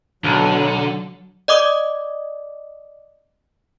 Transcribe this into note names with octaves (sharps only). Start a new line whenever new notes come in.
B1 D3 F#3
D5 D#5 D6 D#6